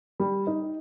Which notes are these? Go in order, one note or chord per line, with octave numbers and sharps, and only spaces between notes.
G3
D#4